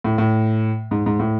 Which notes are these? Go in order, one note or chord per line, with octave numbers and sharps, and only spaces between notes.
A2
A2
G#2
G#2
A2